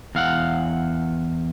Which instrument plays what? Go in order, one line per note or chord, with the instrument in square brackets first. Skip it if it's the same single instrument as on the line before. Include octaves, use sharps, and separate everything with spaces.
[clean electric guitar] E2 F5 F#5